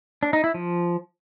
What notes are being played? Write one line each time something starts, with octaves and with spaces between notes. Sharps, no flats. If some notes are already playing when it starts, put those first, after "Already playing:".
D4
D#4
E4
F3